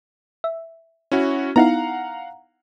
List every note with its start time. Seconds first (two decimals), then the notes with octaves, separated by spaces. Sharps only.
0.44 E5
1.12 C#4 E4 F#4
1.56 B3 D#4 E4 F5 F#5 A#5